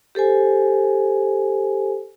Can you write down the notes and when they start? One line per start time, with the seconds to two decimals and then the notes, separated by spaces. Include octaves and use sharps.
0.15 G4 A4 C5 G#5